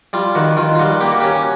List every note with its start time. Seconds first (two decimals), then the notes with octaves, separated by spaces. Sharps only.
0.13 G3 F4
0.35 D#3 F#4
0.57 D#3 F4
0.75 F4
0.79 G3 F#4
1.01 A#3 G4
1.12 F#4
1.21 C#4 G4